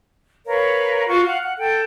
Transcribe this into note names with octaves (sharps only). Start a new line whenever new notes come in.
A#4 B4 C#5 F5
F4 F#4 C#6
F5 F#5
F#5
A4 G5